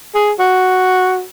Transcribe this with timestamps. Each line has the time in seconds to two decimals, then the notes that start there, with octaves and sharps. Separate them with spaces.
0.14 G#4
0.39 F#4